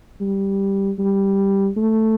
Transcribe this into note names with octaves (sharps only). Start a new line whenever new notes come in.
G3
G3
A3